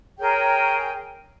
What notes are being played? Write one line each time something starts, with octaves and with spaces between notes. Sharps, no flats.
G#4 A#4 C#5 G5